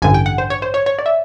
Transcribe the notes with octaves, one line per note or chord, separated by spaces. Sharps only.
A1 G2 D3 G#5
G5
F#5
C5
C#5
C5
C#5
C#5
D5
E5